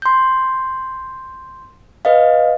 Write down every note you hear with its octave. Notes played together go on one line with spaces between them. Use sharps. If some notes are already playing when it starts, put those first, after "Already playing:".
C6 G6
B4 D#5 F5